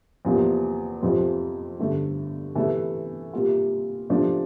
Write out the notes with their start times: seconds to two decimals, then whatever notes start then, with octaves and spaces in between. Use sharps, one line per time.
0.25 E2 C3 F3 A#3
1.02 F2 C3 F3 C4
1.79 G2 D3 A3
2.55 C3 E3 A3 E4 A4
3.33 C3 G3 A#3 F4
4.10 C3 F3 A3 D4